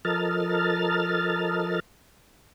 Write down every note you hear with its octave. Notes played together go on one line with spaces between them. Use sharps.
F3 A4 A#4 D#5 F6 A6